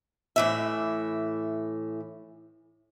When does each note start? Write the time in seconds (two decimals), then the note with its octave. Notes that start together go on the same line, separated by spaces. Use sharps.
0.36 A2 E3 E5